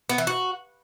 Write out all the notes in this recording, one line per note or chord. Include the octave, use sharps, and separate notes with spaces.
B3
E3
F#4